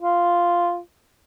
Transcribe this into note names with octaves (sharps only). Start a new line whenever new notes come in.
F4